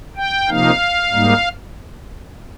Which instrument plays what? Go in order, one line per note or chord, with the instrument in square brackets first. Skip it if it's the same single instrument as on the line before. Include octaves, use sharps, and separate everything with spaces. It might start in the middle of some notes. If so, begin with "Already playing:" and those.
[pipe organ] G5
C3 F3 A#3 D#4 F5
G#2 G3 A#3 D#4